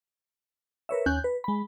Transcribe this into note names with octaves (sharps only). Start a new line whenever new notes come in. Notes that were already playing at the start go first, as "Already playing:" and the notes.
A#4 B4 C#5 E5
D#2 C#4 G#5 F#6 G6
B4
G#3 B5